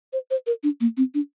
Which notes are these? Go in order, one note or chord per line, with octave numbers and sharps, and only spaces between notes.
C5
C5
A#4
D4
A#3
C4
D4